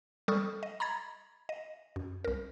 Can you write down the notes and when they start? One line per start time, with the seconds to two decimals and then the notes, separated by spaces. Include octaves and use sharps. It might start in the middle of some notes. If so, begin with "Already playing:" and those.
0.28 G3 A4 C#6 D#6 F6
0.63 D#5
0.80 A#5 B5 G#6 A6
1.49 D#5
1.96 F#2
2.24 C2 A#4